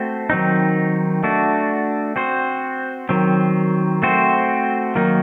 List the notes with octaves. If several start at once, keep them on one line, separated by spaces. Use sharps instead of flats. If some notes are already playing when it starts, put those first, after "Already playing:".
Already playing: A3 C4 F#4 C5
D#3 F#3 C4 D#4
A3 D4 F#4
C4 F#4 C5
D#3 F#3 C4
A3 C4 F#4 C5
D#3 F#3 A#3 D#4